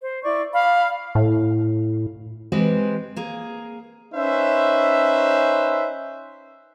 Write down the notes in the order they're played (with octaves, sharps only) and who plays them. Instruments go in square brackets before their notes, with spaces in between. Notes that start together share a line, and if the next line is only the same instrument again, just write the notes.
[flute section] C5
E4 D5 C#6
F5 B5
[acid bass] A2
[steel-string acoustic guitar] E3 G#3 C4 G4 B4 C5
A#3 G#4
[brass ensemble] C#4 D#4 B4 C5 E5